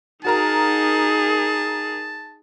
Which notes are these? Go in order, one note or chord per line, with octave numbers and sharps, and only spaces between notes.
D#4 F#4 G#4 A#4 A5 A#5